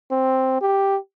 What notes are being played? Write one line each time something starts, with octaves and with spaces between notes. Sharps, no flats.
C4
G4